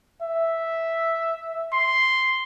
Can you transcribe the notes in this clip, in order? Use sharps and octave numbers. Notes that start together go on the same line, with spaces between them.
E5
C6